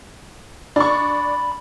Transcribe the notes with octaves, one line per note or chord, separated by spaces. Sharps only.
D4 B5 C#6